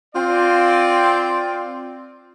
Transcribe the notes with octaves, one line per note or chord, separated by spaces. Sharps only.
C4 F4 D5